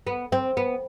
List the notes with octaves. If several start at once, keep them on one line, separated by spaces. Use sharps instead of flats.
B3
C4
B3